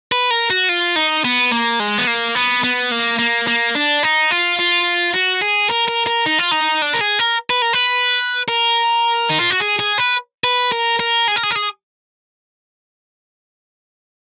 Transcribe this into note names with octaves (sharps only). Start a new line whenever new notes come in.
B4
A#4
F#4
F4
D#4
B3
A#3
G#3
B3
A#3
B3
B3
A#3
A#3
A#3
D4
D#4
F4
F4
F#4
G#4
A#4
A#4
A#4
D#4
F4
D#4
D4
A#4
G#4
A#4
B4
A#4
B4
A#4
D#4
F4
F#4
G#4
G#4
B4
B4
A#4
A#4
G#4
A#4
G#4
A#4
G#4